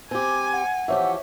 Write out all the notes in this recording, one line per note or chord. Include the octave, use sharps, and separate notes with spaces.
C4 G4 G#5
F#5
E3 F3 G4 C#5 E5